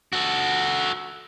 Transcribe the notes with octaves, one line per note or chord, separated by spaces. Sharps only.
F#4 A4